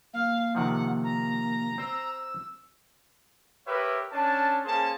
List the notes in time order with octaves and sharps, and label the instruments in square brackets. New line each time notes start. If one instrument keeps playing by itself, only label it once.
[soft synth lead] A#3 [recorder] F5
[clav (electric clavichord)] C3 D#3 F3 [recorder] F#5
[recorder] A#5
[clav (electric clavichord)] C4 C5 [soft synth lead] E6
[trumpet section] G4 A#4 B4 C#5 E5
C#4 D4 A5
A#3 C#4 G#4 C5 A5